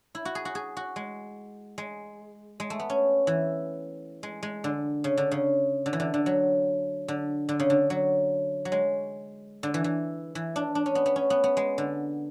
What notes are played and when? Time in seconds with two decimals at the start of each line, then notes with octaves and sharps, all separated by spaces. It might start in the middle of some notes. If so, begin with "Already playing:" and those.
0.15 E4
0.25 F#4
0.35 G#4
0.45 F#4
0.55 G#4
0.77 F#4
0.96 G#3
1.78 G#3
2.60 G#3
2.70 A3
2.79 B3
2.90 C#4
3.27 E3
4.23 G#3
4.43 G#3
4.64 D3
5.04 C#3
5.17 D3
5.31 C#3
5.86 D3
5.93 E3
6.00 D3
6.14 D3
6.26 F#3
7.08 D3
7.49 D3
7.60 C#3
7.70 D3
7.90 F#3
8.65 F#3
8.72 G#3
9.63 D3
9.74 E3
9.84 E3
10.35 E3
10.56 D4
10.75 D4
10.86 C#4
10.95 B3
11.06 B3
11.16 C#4
11.30 B3
11.44 B3
11.57 G#3
11.78 D3